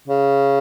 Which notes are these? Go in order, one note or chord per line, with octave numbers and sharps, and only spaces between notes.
C#3